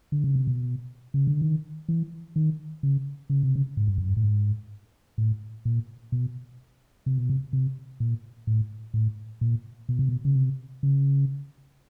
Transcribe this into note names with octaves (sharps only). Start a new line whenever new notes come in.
D3
C#3
C3
B2
C#3
D3
D#3
E3
D#3
C#3
C#3
C3
C#3
G#2
G2
F#2
G2
A2
G#2
A2
A#2
B2
C3
B2
C3
C3
A#2
A2
A2
A#2
B2
C3
B2
C#3
C3
C#3